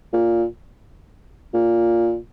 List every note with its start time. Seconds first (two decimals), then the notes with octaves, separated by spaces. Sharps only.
0.13 A#2
1.54 A#2